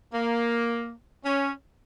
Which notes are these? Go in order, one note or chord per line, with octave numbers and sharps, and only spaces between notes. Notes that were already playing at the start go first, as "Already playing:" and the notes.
A#3
C#4